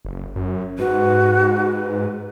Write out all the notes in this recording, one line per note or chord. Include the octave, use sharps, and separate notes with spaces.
F#1
F#2
G#2 F#4 B4